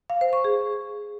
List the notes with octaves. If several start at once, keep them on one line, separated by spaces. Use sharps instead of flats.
F5
C5
C#6
G#4